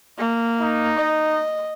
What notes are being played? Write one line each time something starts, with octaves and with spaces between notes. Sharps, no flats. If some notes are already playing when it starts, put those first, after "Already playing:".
A#3
D#4
D#5